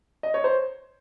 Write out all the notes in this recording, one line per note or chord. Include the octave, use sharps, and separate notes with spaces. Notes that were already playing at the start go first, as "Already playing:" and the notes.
D#5
C#5
C5